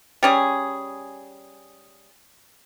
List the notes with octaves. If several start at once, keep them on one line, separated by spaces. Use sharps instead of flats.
G3 C#4 G#4